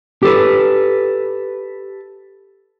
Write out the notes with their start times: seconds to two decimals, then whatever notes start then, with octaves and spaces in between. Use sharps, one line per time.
0.23 G4 A4 B4